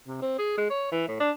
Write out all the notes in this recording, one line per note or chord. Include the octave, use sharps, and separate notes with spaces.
C3
C4
G#4
G#3
C#5
E3
A2
D4